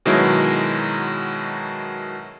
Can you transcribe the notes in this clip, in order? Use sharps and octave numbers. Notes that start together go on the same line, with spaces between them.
B2 D#3 F#3 G#3 E4